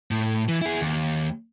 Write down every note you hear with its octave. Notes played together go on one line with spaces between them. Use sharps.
A2
E3
E4 G#4
D#2